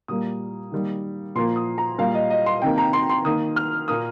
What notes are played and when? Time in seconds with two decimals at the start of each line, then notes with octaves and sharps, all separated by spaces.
0.08 A#2 G3 A#3 D#6
0.72 D#3 G3 A#3
1.35 A#2 F3 A#3 C6
1.56 D#6
1.78 A#5
1.98 A#2 G3 A#3 F5
2.15 D#5
2.30 D#5
2.46 C6
2.62 C3 D#3 A#3 G5
2.78 A#5
2.93 C6
3.10 C6
3.25 D#3 A#3 D#6
3.56 F6
3.88 A#2 A#3 D#6